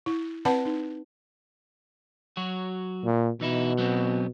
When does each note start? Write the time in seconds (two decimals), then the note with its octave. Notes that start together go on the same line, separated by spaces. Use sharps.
0.06 E4
0.45 C4 B4 D5 F#5 A5 B5
0.65 D#4
2.37 F#3 F#4
3.05 A#2
3.41 B2 E3 D#4 E4
3.78 F#3 B3 C4